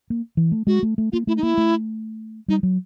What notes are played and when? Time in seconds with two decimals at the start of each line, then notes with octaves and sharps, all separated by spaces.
0.10 A#3
0.37 E3
0.52 A3
0.67 G#3 F#4
0.83 A3
0.98 A3
1.12 A#3 F4
1.27 A3 E4
1.37 D#4
1.43 A#3 E4
1.58 A3
2.48 G3 D#4
2.63 F#3